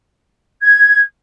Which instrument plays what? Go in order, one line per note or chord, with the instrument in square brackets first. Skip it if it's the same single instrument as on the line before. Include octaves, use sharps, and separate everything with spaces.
[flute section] G#6